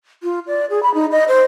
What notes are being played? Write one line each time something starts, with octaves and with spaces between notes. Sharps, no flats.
F4
D5
G#4
B5
D#4
D#5
C5